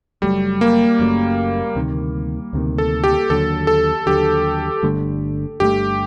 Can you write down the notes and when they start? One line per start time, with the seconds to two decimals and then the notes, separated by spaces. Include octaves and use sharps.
0.22 F#1 F#2 F#3 G3 A3
0.61 A#3
0.99 F#1 F#2 F#3 A3
1.76 D2 C3 D#3
2.53 D2 C3 D#3
2.78 A4
3.04 G4
3.30 D#2 D3 F#3 A4
3.67 A4
4.06 D#2 D3 F#3 G4
4.83 G1 G2 D3 A3
5.60 G1 G2 D3 A3 G4